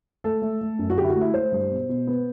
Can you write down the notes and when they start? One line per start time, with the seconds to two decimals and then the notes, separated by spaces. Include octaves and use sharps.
0.24 A3 A4
0.42 A3
0.61 A3
0.79 F#2
0.90 F#4
0.97 D3 G4
1.04 E4
1.09 F#4
1.15 A3
1.21 E4
1.33 A3 C5
1.52 G2
1.70 B2
1.89 B2
2.07 B3